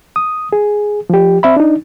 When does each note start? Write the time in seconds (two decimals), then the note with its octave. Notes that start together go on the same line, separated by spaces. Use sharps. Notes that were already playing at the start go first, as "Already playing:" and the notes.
0.16 D#6
0.53 G#4
1.10 F3 G4
1.43 C4 E5 B5
1.56 D4 D#4